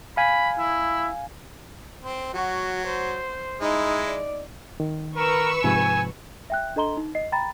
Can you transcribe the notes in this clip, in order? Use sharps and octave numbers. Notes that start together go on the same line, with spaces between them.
F5 G#5 B5
E4
C4
F#3 F#4
C5
G#3 D#4 E4
D5
D#3
A#4 B4 C#6 E6
G#2 C3 F3 G#5
E5 G5 F#6
D4 A4 D#5 A#5 C6 G7
D#4
D#5 C7
G5 A#5 B5 A6